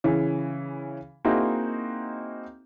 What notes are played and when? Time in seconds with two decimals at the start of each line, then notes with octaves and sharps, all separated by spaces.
0.04 C#3 E3 C#4
1.25 A#3 C4 D#4 E4 F#4 G#4